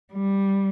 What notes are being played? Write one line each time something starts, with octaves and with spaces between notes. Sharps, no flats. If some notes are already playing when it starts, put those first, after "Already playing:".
G3